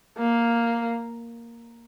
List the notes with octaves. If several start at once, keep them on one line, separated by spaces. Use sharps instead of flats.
A#3